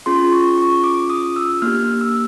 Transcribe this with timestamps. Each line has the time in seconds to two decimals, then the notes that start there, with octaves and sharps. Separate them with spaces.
0.06 C#4 F4 G#4 C6
0.32 C#6
0.58 C#6
0.84 D6
1.10 D#6
1.36 E6
1.62 A#3 D4 G4 F6
2.01 E6